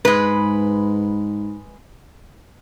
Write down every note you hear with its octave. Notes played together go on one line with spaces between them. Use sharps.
G#2 G#3 B4